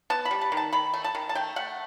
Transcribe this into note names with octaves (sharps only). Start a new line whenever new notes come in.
B3 A5
B5
G3
A5
D#3
A5
D#3 B5
A3
A5
D#3
A5
A3 G5
A3 F#5